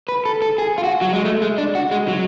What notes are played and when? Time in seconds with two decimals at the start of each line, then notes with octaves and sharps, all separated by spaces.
0.08 B4
0.25 A4
0.42 A4
0.58 G#4
0.78 F4
0.84 F#4
1.01 F#3
1.13 G#3
1.25 A3
1.42 G#3
1.58 D4
1.75 F#4
1.91 G#3
2.08 F#3